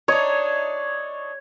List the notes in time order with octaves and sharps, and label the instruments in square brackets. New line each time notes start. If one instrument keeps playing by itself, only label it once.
[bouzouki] D4 D#4 [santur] C#5